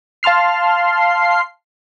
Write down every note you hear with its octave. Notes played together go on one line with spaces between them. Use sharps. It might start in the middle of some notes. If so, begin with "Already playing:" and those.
F5 A5 C6 F6 C7